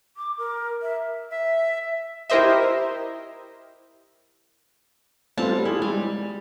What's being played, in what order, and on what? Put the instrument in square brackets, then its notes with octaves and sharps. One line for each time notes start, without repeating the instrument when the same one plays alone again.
[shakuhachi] D6
A#4
E5
[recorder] E5
[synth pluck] E4 G4 A#4 C5 D#5 E5
[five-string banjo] G3 C4 A5 [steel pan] A3 B3 F4
[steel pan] G4
[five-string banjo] E4 [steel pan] G4 G#4
[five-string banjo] G3 [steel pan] G#3 G4